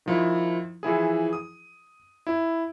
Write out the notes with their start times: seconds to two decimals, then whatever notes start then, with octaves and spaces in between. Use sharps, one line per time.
0.06 D#3 F3 E4
0.83 E3 F3 E4 G#4
1.33 D#6
2.27 E4